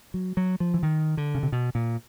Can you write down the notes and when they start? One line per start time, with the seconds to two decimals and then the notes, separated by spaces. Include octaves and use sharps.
0.14 F#3
0.37 F#3
0.60 F3
0.74 E3
0.83 D#3
1.17 D3
1.35 C#3
1.43 C3
1.52 B2
1.75 A#2